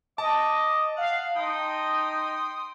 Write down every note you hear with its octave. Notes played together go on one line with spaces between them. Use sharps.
D#5 A5 D6
F5 F#5
D#4 G5 C6 D#6